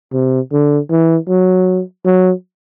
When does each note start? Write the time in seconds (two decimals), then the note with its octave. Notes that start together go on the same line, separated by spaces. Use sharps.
0.13 C3
0.52 D3
0.90 E3
1.28 F#3
2.05 F#3